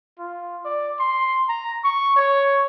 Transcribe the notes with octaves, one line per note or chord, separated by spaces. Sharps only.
F4
D5
C6
A#5
C#6
C#5